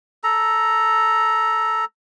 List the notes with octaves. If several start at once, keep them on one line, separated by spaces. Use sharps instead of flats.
A4 A#5